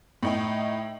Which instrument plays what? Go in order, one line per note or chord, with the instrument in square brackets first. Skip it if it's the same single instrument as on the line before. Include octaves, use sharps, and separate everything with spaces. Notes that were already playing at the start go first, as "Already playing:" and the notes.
[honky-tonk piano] A2 D#4 G5